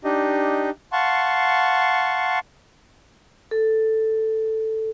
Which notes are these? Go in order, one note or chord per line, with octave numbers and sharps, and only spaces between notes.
D4 D#4 G4 D#5
F5 F#5 A5 C6 C#6
A4